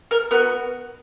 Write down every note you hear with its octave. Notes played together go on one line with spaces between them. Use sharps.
A#4
B3 F#4 A#4